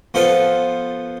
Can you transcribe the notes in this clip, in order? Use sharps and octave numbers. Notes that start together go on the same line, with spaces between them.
F3 B3 F4 A4 C5